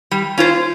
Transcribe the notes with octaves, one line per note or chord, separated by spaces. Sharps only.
G3
C#4 F4 C5